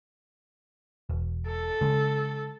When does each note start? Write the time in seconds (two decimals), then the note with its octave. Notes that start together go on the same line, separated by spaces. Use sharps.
1.09 E1
1.47 A4
1.81 C#3 G#3